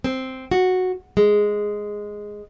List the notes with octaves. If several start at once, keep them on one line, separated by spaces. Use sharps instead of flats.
C4
F#4
G#3